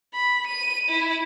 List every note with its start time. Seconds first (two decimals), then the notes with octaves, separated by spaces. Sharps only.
0.14 B5
0.47 D#7
0.89 E4